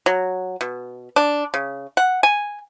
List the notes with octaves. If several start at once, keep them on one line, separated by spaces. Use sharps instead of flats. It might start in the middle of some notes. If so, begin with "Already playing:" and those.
F#3
B2
D4
C#3
F#5
G#5